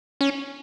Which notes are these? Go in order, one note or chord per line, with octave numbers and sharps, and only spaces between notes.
C#4